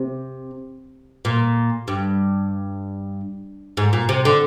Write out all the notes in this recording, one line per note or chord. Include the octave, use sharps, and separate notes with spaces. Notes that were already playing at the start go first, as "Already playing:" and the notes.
Already playing: C3
A#2
G2
G#2
A#2
C3
D3